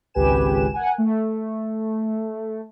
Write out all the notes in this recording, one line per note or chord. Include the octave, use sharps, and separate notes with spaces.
G#1 C#2 G4 B4 G#5 E7
A#4 F#5 G#5
A3